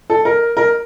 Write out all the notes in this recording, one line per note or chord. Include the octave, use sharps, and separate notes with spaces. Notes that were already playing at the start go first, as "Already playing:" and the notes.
A4
A#4
A#4